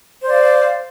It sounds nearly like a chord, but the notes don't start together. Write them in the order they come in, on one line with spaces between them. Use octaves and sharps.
C5 D5 F5